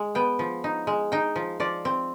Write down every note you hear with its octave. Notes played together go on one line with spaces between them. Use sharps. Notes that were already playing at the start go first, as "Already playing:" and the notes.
Already playing: G#3
B3 G5
F3
D#4
G#3
D#4 G5
F3
F3 D5
C4